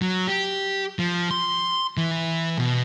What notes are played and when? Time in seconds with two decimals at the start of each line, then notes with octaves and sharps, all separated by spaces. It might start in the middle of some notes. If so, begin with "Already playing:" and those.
0.02 F#3
0.28 G4
0.99 F3
1.31 C6
1.97 E3
2.58 B2